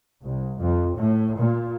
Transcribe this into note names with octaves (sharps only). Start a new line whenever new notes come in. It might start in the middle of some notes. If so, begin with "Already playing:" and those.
C2
F2
A2
A#2